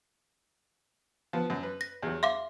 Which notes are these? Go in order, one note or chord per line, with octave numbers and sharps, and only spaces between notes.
F3 B3
F#2
B4
A#6
E2 F#3
E5 F5 C6 D6